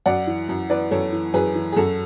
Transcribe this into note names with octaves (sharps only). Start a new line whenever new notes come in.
F#2 D5 F#5
E3
F#2
E3 B4 D5
F#2 A4 C#5
E3
F#2 G#4 B4
E3
G#4
F#2 F#4 A4